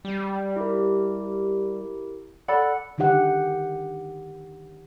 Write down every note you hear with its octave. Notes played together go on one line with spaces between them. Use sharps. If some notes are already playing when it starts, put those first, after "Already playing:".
G3
E4 G4 A#4
A4 D5 F#5 B5
D3 D#3 D#4 G4 F#5